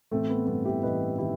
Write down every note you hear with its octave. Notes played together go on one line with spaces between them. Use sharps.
A1 A3 C4
B3
G2 B3
E4 G4
A1 B4 D#5
D#3 E4 G4